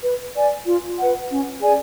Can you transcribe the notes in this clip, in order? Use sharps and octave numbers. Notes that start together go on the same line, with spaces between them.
B4
D5 G#5
F4
B4 F#5
C#4
G#4 D5 G#5